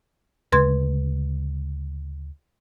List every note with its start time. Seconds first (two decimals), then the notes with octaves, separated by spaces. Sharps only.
0.52 D2 C#3 G#3 B4 C6 G#6